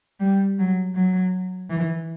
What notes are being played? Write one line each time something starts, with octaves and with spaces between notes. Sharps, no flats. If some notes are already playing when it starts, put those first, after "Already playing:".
G3
F#3
F#3
E3